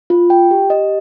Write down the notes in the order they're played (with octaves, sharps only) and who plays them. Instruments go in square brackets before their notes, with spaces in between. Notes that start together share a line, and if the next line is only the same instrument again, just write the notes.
[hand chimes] F4
G5
G4
D#5